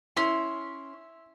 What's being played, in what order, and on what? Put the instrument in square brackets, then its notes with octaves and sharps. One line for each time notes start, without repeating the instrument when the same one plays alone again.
[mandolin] C#4 C6 [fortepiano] E4